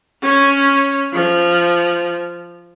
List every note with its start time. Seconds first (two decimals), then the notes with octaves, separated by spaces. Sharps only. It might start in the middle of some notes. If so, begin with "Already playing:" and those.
0.22 C#4
1.13 F3